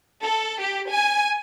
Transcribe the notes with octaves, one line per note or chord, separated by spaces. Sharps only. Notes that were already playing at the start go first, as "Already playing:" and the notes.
A4
G4
G#5